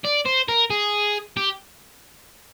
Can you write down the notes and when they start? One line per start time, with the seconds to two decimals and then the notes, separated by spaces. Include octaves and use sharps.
0.04 D5
0.25 C5
0.48 A#4
0.70 G#4
1.37 G4